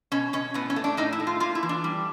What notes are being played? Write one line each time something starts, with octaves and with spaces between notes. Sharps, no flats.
B2 C#4
B2 C#4
A2 B3
C#4
A3
D4
A2 D#4
E4
A3
F4
A#3 F4
E4
E3
D4
G3